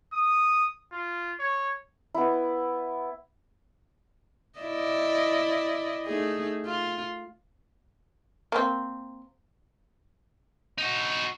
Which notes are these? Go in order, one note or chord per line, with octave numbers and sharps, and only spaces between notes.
D#6
F4
C#5
B3 E4
E4 D5 D#5
A3 D#4 G#4
F4
A#3 C4
D#4 F#4